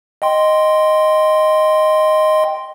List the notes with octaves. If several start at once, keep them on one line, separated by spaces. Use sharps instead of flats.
D#5 G5 C6